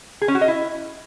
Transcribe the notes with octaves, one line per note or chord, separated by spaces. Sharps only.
G#4
C#4
F#4
D#5
E4